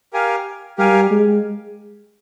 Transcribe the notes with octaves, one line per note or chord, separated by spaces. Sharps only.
G4 A#4 F5 G#5
G3 G4 A#4 F5 G#5
G#3